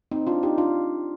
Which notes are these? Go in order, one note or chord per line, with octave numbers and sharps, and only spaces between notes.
C4 D#4
D4 F4
D#4 G4
D4 F4